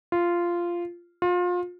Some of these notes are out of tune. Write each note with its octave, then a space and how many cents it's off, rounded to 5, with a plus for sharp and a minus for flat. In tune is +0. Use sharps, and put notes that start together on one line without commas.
F4 -10
F4 +30